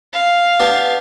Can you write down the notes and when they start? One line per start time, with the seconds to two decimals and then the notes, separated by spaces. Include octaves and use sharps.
0.13 F5
0.60 B3 D4 G4